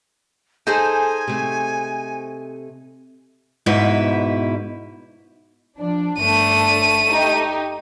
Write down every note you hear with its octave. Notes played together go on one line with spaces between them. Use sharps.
D#4 G#4 A4 C5 G#5
C3 A3
G#2 B2 E4 B4
F3 D4
G1 A3 D4 D#7
D#4 G4